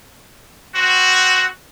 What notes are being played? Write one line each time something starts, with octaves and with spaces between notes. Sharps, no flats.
C4 F#4